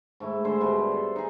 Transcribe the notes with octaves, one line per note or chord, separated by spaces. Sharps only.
G#2 A3 E4
D3 G#4 C5
G#2 B2 G3 C5
A4 C5 B5
D#4 G#4